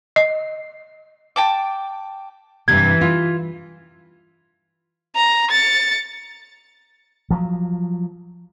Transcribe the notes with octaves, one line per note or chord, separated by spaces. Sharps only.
D#5
G5 A5 D6
G2 C3 E3 G#6
F4
A#5
A6 C#7
F3 F#3